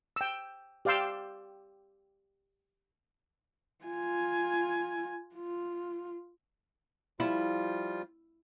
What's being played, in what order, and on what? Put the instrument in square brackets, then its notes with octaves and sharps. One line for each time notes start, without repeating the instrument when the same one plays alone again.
[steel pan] G5 E6
G4 D5 F5 G5 C6 E6
[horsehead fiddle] F4 G#5
F4
[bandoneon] F3 G3 F4 [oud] E4